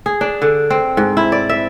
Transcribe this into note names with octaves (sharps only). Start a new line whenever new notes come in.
G#4
D4
D3
C4
G#2
E4
D5
E5